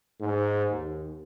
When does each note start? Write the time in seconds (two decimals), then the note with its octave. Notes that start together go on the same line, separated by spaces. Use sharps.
0.20 G#2
0.70 D#2